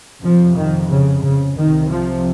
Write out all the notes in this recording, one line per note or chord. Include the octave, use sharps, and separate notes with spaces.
F2 C3 F3
D#3
C#3
C#3
C2 C3 D#3
F3